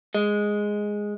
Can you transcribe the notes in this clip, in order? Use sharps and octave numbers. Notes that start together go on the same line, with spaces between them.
G#3